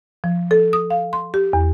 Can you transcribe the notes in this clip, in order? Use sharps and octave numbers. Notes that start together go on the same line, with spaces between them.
F3
A4
D#6
F5
C6
G4
E2